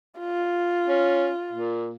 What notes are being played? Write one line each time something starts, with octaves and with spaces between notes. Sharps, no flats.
F4
C#4
A#2